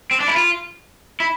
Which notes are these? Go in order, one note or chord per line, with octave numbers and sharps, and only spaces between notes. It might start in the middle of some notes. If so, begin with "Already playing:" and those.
C4
D4
E4
F4
E4